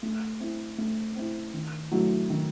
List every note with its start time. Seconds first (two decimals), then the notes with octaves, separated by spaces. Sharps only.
0.03 A3
0.40 C4 E4
0.78 A3
1.16 C4 E4
1.54 D#3
1.91 F#3 A3 E4
2.30 D#3